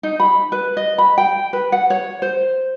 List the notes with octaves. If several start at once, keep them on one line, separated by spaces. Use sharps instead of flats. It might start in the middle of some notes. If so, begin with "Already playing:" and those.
D#4
B5
B4
D#5
B5
G5
B4
F#5
C#5
C5